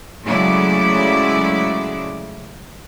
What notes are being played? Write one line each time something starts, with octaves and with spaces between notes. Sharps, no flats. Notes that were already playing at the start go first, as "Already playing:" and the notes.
C#3 F#3 G#3 A3 E4 D5